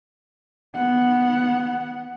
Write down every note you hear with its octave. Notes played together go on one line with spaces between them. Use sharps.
B3 F#5